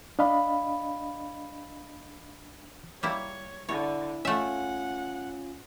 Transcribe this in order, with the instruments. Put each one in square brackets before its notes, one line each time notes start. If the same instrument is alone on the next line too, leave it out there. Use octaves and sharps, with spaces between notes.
[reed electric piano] D4 D#5 F5 B5
[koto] G3 A#3 E4 [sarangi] C#5
[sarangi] D3 [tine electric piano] E4 [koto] C#5
[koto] A3 E5 [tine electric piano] C#4 F4 [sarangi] F#5